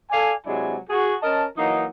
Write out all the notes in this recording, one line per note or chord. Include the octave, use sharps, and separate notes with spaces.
A4 D5 F5 G#5
C3 F#3 G#3 D4 E4 G#5
F#4 G#4
C#4 A#4 D#5 A5
E3 F#3 A#3 D#4